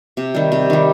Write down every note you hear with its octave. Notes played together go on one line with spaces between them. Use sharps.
C3
D#3 G3
C3
D#3 G3